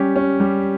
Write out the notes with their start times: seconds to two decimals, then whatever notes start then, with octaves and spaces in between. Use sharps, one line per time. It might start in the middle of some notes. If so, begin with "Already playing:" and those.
Already playing: G3 C#4 G4
0.16 C#4
0.40 G3